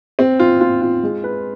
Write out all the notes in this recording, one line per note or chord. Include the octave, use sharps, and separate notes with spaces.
C4
F4
F4
F4
G#3
B4